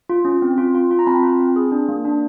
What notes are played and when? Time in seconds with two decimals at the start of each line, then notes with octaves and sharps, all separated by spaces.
0.09 F4
0.25 C#4
0.42 C4
0.58 F4
0.74 F4
0.91 F4
0.99 A#5
1.07 C4 A5 B5
1.23 F4
1.40 C4
1.56 G#4
1.72 D4
1.89 A#3
2.05 D4